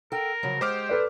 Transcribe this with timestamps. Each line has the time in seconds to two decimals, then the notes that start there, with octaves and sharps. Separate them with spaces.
0.12 A4 A#4 G5
0.43 C#3 F3 F#3
0.61 G#3 G4 C5 D6 F6
0.89 A4 B4 D5